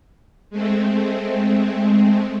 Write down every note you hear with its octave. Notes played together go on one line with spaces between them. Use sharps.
G#3 A3 C4